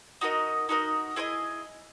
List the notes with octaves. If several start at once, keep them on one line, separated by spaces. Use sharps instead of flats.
D#4 F#4 A#4 D#5
D#4 F#4 A#4 D#5
E4 G#4 C5 D#5